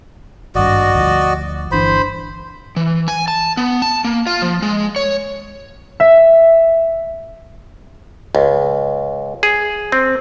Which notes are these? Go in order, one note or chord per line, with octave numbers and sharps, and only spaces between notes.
G#1 G2 F#4 D5 D#5
D2 F3
G1 E3 D4 C5 B5
E3
G#5
A5
B3
A5
A#3
F4
F3
G#3
C#5
E5
C#2
G#4
C4